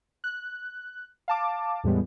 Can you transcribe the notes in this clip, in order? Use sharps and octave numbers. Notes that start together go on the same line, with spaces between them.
F#6
F5 A5 D6
E2 A2 G3 G#3 B3